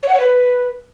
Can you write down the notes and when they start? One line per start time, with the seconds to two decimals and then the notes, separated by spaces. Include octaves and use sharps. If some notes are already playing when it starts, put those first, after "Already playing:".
0.03 C#5
0.09 F#5
0.14 C#5
0.20 B4